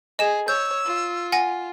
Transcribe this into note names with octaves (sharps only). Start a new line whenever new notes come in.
G#4 D#5 E7
C#5 E6 G6
F4
F#5 G#5 A#6